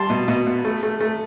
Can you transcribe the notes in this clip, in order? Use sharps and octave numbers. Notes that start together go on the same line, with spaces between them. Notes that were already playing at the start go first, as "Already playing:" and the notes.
Already playing: G3 A5 C6
B2
B2
B3
A3
A3
A3